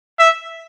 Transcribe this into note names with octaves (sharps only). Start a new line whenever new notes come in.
E5